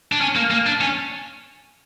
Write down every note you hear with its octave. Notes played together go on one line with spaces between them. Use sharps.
D4
C#4
A#3
A#3
D4
C#4